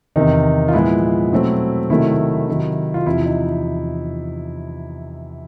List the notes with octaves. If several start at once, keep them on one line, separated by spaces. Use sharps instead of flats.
E2 C3 D#3 D#4
F4
A#2 F3 G#3 B3 E4
B2 F#3 A3 C4
C3 D#3 F#3 A3 E4
C3 D#3 F#3
F4
E2 C3 F3 E4
D#4